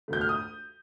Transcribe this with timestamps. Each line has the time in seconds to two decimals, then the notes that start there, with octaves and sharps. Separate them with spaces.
0.08 D2 D3 A3 G6
0.21 F6
0.29 D#6